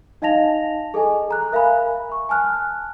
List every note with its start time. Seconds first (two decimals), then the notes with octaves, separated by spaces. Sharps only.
0.22 D#4 D#5 F5 A5 A#6 F7
0.94 G#4 A4 D#5 G#5
1.31 A#5 F#6
1.52 A#4 E5 F5 G#5 B5
2.12 C#6
2.29 G#5 A5 F6 F#6